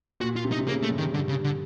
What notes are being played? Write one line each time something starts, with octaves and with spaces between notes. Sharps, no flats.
A#2 F#4
F4
C3
D#4
C3
C#3 A#3
A3
G2
D#3
G2 D3
C#3
D3